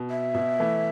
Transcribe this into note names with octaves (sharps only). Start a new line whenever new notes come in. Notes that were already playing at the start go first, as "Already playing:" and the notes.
Already playing: B2
E5
B2
E3 A3